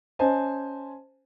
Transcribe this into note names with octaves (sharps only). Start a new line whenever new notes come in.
C#4 C5 D#5 G#5 A5